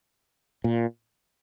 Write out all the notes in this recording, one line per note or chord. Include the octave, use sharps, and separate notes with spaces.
A#2